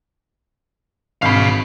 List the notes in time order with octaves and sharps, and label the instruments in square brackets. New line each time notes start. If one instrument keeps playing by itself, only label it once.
[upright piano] G#1 [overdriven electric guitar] F5 B5